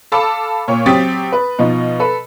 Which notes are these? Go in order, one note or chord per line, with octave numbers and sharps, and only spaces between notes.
A4 F5 A5 B5 D6 E6
A#2 C#5
F#3 C4 G4 D#6 A6 B6
B4
B2 F3 D#4
A4 B4